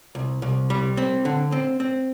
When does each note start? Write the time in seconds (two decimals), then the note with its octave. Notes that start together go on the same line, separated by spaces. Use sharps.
0.15 C2
0.42 C2
0.70 G3
0.97 C4
1.25 D3
1.52 C4
1.80 C4